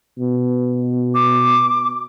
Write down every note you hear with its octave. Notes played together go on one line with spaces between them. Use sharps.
B2
D6